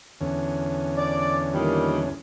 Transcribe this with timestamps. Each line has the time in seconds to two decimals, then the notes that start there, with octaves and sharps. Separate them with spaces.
0.21 E2 D3 C#4
0.97 D5
1.53 A#2 D#3 G3